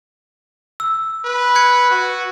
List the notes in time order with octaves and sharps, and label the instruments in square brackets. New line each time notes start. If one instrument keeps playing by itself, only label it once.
[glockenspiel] E6
[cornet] B4
[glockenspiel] F#6 G#6 C#7
[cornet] F#4